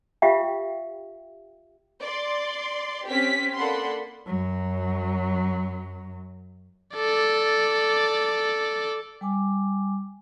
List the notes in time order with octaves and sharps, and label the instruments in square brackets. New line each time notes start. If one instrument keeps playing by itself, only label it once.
[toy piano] F4 G4 E5 F5 G5
[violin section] D5 C6
C4 C#4 G4 B6
A#3 D4 A4 F#5 B5 C6
[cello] F#2 F#3
[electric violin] A4 D5
[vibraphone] G3 G#5 D6